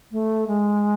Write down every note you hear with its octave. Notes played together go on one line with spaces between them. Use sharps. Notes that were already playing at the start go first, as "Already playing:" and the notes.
A3
G#3